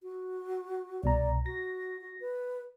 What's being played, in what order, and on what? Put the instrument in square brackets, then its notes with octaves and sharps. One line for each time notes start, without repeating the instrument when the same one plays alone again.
[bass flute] F#4
[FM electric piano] C2 B2 A#5 [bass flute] D5
[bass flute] F#4 [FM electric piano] A#6
[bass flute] F#4
B4